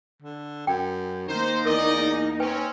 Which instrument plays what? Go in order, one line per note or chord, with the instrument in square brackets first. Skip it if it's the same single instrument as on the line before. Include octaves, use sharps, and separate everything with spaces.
[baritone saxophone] D3
[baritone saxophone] F#2 [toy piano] G5
[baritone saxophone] D#3 [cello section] A#3 D#4 [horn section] C5
[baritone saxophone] E2 [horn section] G#4 D5 D#5 [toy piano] A#4
[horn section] C4 C#4 [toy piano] B4 G5 G#5